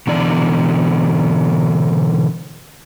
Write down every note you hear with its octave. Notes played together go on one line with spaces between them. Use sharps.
B2 D3 E3 D5